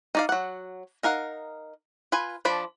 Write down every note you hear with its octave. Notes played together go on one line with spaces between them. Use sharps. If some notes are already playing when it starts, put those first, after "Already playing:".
D#4 D5 F5
F#3 F#5
D#4 A#4 F5 F#5
F4 B4 G#5
F3 D4 D5 B5